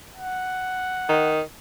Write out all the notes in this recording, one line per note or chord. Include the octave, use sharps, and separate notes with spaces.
F#5
D#3